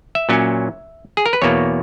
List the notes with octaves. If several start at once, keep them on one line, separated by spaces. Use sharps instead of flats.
E5
A#2 F#3 C#4
G#4
A#4
B4
E2 B2 A#3 C#5